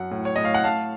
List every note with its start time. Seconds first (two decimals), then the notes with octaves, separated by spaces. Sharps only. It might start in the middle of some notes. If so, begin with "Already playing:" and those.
Already playing: F#2 F#5
0.11 A2
0.25 C#5
0.36 A2 D#5
0.45 F5
0.54 F#5
0.63 A2 F5 A5